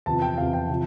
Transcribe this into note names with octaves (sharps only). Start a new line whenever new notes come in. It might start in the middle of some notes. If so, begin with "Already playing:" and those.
E2 C3 F3 A5
G5
E2 C3 F3 F5
G5
C3 F3